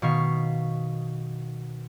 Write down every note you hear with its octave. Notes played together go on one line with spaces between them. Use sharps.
B2 D#3 F5 C#6 B6